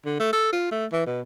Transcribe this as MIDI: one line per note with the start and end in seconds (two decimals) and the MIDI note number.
0.05 0.15 50
0.20 0.32 57
0.33 0.52 69
0.53 0.66 65
0.72 0.86 57
0.92 1.04 52
1.06 1.21 47